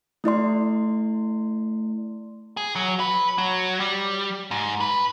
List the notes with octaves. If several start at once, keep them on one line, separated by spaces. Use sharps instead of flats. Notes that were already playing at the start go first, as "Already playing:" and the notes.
A3 E4 D5 C6
G#4
F#3
B4
F#3
G3
G#2
B4